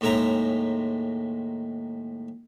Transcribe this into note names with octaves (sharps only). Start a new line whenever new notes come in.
D#2 A2 G#3 E5 G5 A#5